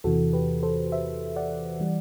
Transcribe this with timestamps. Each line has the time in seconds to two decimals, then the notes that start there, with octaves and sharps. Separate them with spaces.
0.04 E2 C3 E3 F#4 A4
0.33 G4 B4
0.63 A4 C5
0.92 C5 E5
1.36 D5 F#5
1.80 E3 G3